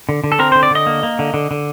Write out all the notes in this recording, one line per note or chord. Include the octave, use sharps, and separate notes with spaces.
D3
D3
A4
C4 A#4
C5
D3
D5
D3 D#5
A#3
A#3
D3
D3
D3